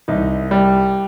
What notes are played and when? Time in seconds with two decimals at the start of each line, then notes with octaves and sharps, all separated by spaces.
0.08 C2 D#4
0.51 G3